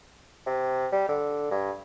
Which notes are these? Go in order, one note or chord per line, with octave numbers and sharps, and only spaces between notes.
C3
G3
D3
G2